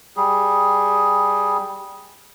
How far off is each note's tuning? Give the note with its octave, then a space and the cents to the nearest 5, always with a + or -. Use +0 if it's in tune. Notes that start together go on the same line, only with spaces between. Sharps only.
G3 +0 G#4 +0